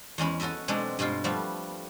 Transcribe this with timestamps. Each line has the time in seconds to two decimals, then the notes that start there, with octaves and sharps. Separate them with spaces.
0.18 E2 G#3 C#4 B5
0.40 C#4 F#4 A4 D#5 E5
0.68 B2 F#3 G#3 C4 D4 A4
0.99 G2 B2 G#3 F4
1.24 F3 G3 A3 B3 E5